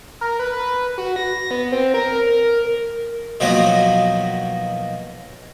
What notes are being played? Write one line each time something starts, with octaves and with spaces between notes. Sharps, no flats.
A#4
B4
F#4
A#6
B3
C4
A#4
A#4
B2 D#3 F3 F#3 A#3